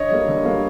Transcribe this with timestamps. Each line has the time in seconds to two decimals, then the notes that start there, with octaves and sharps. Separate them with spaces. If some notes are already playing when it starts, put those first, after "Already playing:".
Already playing: D3 C#5 D#5
0.11 G3 A#3
0.28 D3
0.45 G3 A#3